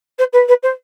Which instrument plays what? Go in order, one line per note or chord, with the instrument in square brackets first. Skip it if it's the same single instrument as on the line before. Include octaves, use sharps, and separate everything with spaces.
[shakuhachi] C5
B4
B4
C5